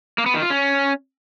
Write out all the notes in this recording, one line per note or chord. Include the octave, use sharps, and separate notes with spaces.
A#3
B3
D#3
F4
C#4